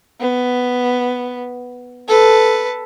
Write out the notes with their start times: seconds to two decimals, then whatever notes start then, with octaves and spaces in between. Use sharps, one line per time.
0.20 B3
2.09 A4 B4